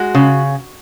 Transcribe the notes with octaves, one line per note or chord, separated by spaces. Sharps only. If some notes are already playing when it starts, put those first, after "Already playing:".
Already playing: G#3 F#4
C#3